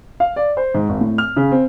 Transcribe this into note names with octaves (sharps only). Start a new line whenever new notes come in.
F5
D5
C5
G#2
G#1
A2
F6
C#3
C4